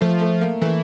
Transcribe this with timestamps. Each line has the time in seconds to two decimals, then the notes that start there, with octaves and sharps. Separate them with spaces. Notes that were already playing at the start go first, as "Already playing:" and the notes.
0.01 F3 A3
0.21 A3
0.41 A#3
0.61 E3 A3